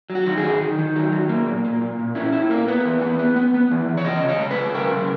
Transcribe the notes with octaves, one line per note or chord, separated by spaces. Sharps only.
F#3
F#4
D#3
G#4
D#3
D#3
D#3
F#3
F#3
A#3
A#2
A#3
A#2
A#2
C#4 E4
A#2 E4
A#3 A#4
B3 B4
E3
B3
B3
B3
B3
E3
E3
C#5
C#3 D#5
C#3
C#5
G#3
B4
C#3
C#3 A#4
C#3